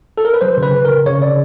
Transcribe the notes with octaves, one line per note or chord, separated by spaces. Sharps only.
A4
A#4
B4
F#3 C5
C#3
B4
C#3
C#3 A#4
C#3 C#5
C#3 D5